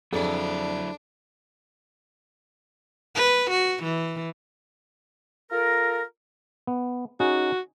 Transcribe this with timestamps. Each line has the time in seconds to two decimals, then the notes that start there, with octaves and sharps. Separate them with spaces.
0.13 F2 F#3 D4 E4 G#4 A4
3.15 B4
3.50 F#4
3.83 E3
5.51 F4 A4 A#4
6.67 B3
7.20 C#4 D#4 F#4 G#4